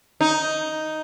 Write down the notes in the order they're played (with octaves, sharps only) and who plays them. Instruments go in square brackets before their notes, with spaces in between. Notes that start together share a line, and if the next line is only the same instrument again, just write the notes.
[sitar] D#4